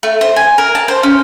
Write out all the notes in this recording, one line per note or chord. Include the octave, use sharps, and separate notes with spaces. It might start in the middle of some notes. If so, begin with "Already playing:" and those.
A3
C5
G#5
A#4
A5
C5
C#4